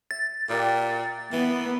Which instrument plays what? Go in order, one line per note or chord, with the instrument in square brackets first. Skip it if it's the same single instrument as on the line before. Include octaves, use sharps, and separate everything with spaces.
[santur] E5 [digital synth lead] A6
[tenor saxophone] A#2 [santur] G4 A#4 D5
[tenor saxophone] E3 [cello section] B3